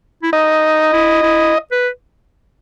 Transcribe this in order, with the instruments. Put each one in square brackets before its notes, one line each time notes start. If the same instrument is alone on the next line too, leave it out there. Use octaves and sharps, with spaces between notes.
[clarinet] E4
[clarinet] D#4 [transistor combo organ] D#5
[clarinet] E4
E4
B4